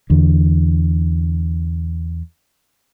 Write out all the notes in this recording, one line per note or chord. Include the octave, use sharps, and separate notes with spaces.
E2 D3